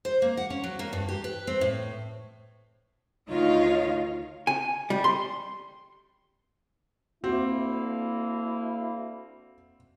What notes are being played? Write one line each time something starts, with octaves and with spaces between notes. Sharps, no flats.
C5
A#3
F#5
C#4
F#3
A#3
G2
G4
B4
C4
A2
D2 D#3 D#4 F4 C#5 F5
G#5
G3
C6
D2 A#3 C4 E4 F#4